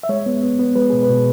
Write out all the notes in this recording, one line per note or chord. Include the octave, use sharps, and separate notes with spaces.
E5
G#3 C#5
B3
B3
B3
G#3 B4
B2 G#4
B4
B2